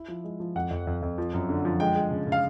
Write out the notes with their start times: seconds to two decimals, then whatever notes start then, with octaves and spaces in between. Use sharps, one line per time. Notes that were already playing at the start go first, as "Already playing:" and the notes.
Already playing: E4
0.08 F3
0.24 G#3
0.40 F3
0.56 F2 F#5
0.71 F2
0.87 F2
1.02 F2
1.18 F3
1.33 F#2
1.49 D3
1.65 F3
1.80 G#3 G5
1.96 G#3
2.11 C#3
2.27 C#3
2.32 F5